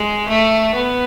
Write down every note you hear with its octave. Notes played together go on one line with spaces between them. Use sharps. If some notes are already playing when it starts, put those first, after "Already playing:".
Already playing: G#3
A3
B3